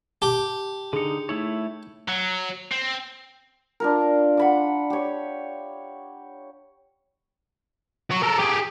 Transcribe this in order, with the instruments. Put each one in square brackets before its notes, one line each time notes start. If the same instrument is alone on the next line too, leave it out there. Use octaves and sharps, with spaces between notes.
[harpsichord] G4 [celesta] A5
[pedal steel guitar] D3 D#4 [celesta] G#4 C#7
[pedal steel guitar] A3 E4 C#5 [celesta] D#4
[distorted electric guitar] F#3
C4
[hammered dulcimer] D4 F4 A#4
F#5 B5 D6
G4 C#5
[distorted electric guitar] F#4 C#5
A4 A#4
G4 G#4